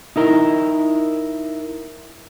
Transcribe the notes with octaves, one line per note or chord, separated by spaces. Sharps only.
D#4 E4 A#4